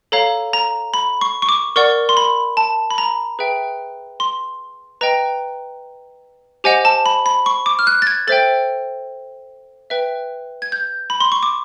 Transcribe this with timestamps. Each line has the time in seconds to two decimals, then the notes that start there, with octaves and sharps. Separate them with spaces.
0.12 A4 C#5 F5 A#5
0.53 A#5
0.94 B5
1.21 C#6
1.42 C#6
1.49 D6
1.76 A#4 D5 F#5 C#6
2.09 C6
2.17 B5
2.57 A5
2.91 B5
2.98 A#5
3.39 G#4 B4 E5 G5
4.20 C6
5.01 B4 D#5 G5 A#5
6.64 G4 C5 D#5 F#5 G#5
6.85 A5
7.06 B5
7.26 B5
7.46 C#6
7.66 D6
7.79 F6
7.87 F#6
8.02 A6
8.07 G#6
8.27 A4 C5 E5 G5 A6
9.90 B4 E5 G5
10.62 G#6
10.72 G6
11.10 B5
11.20 C6
11.32 C#6
11.43 D6